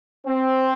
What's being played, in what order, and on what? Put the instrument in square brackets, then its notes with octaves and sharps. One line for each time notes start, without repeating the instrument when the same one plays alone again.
[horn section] C4